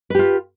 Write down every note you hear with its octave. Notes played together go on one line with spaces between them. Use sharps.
F4 G4 B4